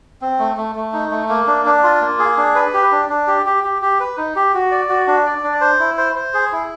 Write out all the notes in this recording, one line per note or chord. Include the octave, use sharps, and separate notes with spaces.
C4
A3
A3
A3
D#4
A3
A#3
D4
D4
F4
A#3
G#4
D4
B4
G4
D4
D4
G4
G4
G4
G4
B4
D#4
G4
F#4
D5
F#4
D4
D5
D4
C5
E4
C5
C5
G#4
E4